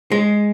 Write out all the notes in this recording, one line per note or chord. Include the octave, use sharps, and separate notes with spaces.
G#3